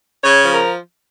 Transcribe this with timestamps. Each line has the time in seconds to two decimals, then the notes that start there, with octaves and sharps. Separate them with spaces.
0.23 C#3 C#5
0.43 F3
0.50 A#4